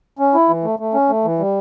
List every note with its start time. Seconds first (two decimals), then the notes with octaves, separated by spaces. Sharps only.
0.19 C#4
0.34 E4
0.49 E3
0.64 A3
0.79 A3
0.94 C#4
1.09 A3
1.25 E3
1.39 G3